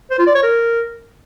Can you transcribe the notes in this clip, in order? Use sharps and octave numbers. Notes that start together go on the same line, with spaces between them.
C5
F4
D5
C#5
A#4